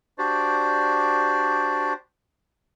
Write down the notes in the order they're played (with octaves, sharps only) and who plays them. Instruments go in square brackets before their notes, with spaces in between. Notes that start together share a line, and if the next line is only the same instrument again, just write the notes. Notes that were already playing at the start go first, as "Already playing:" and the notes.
[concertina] D4 F#4 G4 C5 D5